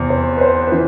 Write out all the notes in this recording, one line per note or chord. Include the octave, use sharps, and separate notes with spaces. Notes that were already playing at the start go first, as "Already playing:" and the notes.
Already playing: E2 C3
C5
B4
C5
B4
E3